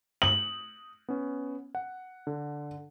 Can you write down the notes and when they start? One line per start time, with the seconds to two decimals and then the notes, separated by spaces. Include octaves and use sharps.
0.22 D#6 F#7
1.09 B3 C#4
1.75 F#5
2.27 D3